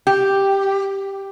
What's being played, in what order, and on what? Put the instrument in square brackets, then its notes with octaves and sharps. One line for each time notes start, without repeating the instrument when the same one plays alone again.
[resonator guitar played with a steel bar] G4